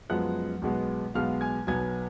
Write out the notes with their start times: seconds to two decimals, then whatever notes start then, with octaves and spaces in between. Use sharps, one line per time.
0.10 F#2 F3 G#3 B3 F#5 F#6
0.62 B1 B2 G#3 B3
1.14 B1 B2 G#3 B3 F5 F6
1.41 G#5 G#6
1.67 B1 B2 F#3 B3 G#5 G#6